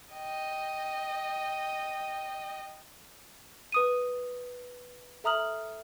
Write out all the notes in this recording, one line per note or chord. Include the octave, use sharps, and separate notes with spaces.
D#5 G5
B4 D#6 D#7
A4 E5 A#5 D#6 F6 F#7